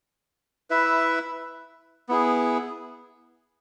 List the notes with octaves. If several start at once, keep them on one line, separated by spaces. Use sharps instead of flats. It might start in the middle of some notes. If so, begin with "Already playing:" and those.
E4 B4 E5
B3 E4 G#4